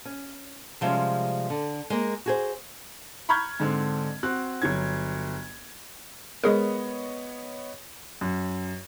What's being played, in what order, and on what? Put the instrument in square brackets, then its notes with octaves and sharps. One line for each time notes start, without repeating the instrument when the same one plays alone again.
[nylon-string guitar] C#4
C3 F3 G3 G#3 C#4
D3
G#3 A#3
F#4 G#4 C5
[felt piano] A#5 B5 C#6 F6 G6 G#6
G#2 D3 C4 D4
C4 F#4 F#6
G1 F#3 G#6
[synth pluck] G#3 G#4 A#4 [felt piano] B3 C#5 D#5
[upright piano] F#2